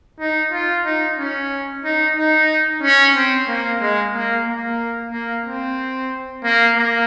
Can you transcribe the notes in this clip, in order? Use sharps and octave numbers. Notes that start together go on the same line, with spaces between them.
D#4
F4
D#4
C#4
D#4
D#4
C#4
C4
A#3
G#3
A#3
A#3
A#3
C4
A#3
A#3